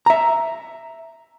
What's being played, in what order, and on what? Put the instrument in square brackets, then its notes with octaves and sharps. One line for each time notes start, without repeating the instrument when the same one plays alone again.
[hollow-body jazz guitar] E5 A#5